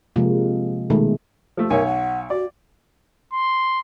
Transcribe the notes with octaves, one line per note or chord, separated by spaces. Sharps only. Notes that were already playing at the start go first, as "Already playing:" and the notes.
C3 F3 G#3 A#3
B2 D#3 G#3 A3
F3 A3
B1 A#4 C#5 G#5
F#5
F#4 D5
C6